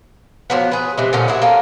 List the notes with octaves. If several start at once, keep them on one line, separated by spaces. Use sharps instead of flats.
F3 F#3 B3
G#4 B4
C3 E3 G#3
A#2 D3 F3 C#4
E4 F#4 G#4
A#3 C#4 F#4 A4